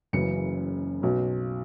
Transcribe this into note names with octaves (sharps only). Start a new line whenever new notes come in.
F#1 F#2 C#3 E3 C#7
B1 B2 F#3